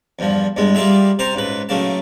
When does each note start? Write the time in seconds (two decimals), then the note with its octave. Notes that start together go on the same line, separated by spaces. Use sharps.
0.19 E2 G2 F3
0.57 E2 G2 G#3
0.75 G3 A#3 F4 G#4 E5
1.19 C3 C5 A5 A#5
1.35 C#2 G#2 B4
1.69 B1 C#3 A3 A#3 A5